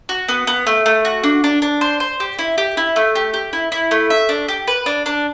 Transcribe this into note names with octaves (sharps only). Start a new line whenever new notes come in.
F#4
B3
B3
A3
A3
F#4
D4
D4
D4
C5
C5
G4
E4
G4
E4
A3
G4
G4
E4
E4
A3
E5
D4
G4
B4
D4
D4